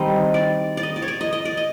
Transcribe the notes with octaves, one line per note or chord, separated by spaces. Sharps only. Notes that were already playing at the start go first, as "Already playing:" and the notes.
Already playing: D#3 G3 C4 D#4 D#5
D5
D5
D#5
D5
C#5
D5
D#5
D#5
D5
D#5